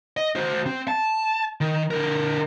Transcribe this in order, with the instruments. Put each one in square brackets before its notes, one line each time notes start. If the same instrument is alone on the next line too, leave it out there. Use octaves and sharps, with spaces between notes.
[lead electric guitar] D#5
F#4 C5
C4
A5
D#3
D3 A#4